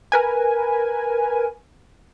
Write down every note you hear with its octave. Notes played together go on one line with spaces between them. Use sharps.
A#4 B4 G#5